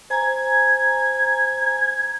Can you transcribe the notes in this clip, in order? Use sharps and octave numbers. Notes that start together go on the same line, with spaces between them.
C5 G#5 A#5 G#6